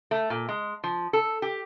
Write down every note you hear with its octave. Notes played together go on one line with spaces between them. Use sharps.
A3
A#2
G#3
F3
A4
G4